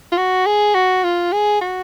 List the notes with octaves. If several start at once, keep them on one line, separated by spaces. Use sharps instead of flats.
F4
F#4
G#4
F#4
F4
G#4
F#4